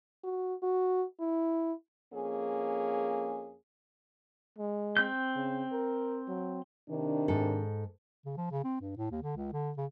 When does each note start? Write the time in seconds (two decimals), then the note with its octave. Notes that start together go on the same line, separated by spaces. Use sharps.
0.24 F#4
0.63 F#4
1.20 E4
2.13 F2 A#3 C#4 G#4
4.58 G#3
4.97 C4 G6
5.36 C#3
5.72 A#4
6.28 F#3
6.89 C3 D#3 D4
7.28 G#2 A4
8.26 C#3
8.37 F3
8.51 C#3
8.64 C4
8.81 G2
8.97 A2
9.11 D#2
9.23 D3
9.36 C#2
9.53 D3
9.77 C#3